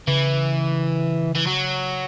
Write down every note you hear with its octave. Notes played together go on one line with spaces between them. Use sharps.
C#3 E3
E3
F#3